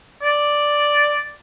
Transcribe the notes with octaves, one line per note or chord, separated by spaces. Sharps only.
D5